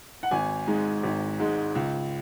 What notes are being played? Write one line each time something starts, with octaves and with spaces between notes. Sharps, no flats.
F#5
G#1 G#5
G#2 G#3
G#1
G#2 G#3
C#2